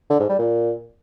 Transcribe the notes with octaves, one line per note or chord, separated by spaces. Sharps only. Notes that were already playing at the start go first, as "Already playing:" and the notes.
D3
G#2
G3
A#2